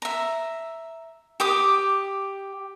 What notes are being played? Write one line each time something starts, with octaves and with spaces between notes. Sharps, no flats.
E5 A#5
G4 D6 D#6